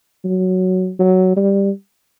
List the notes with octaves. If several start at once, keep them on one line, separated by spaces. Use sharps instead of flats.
F#3
F#3
G3